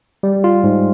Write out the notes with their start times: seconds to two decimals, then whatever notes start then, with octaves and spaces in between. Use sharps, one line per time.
0.23 G3
0.44 F4
0.64 G#2